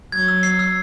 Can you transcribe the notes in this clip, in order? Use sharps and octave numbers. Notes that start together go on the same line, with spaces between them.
F#3 G#6
E6
C7
E6